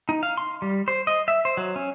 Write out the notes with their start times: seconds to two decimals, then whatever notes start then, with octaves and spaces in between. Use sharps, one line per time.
0.09 D#4
0.23 F5
0.37 C6
0.62 G3
0.88 C5
1.07 D#5
1.28 E5
1.45 C5
1.57 F#3
1.76 C#4